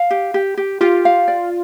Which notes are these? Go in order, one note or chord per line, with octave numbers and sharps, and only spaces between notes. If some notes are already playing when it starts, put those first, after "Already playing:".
Already playing: F5
G4
G4
G4
F4 G4
F5
D5